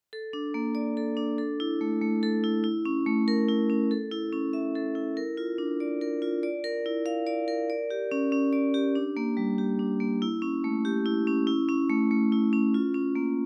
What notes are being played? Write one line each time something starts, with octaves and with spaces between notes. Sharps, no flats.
A4
D4
A#3
D5
A4
D4
A4
E4
A3
A3
A4
E4
E4
C#4
A3
A#4
E4
C#4
A4
E4
C#4
E5
A4
E4
A#4
F4
D4
D5
A#4
F4
D5
A#4
E4
F5
D5
A#4
D5
G4
C#4
C#4
D5
G4
D4
A#3
G3
G4
D4
A#3
E4
C#4
A3
G4
E4
C#4
E4
C#4
A3
A3
E4
C#4
F4
C#4
A#3